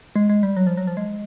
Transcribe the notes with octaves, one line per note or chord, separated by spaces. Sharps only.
G#3
G#3
G3
F#3
F3
F#3
F3
G#3